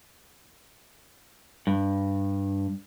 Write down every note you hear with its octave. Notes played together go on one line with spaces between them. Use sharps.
G2